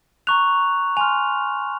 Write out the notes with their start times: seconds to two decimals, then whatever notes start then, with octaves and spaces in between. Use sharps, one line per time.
0.27 A#5 C#6 F#6 F7
0.97 G#5 C6 F6 F7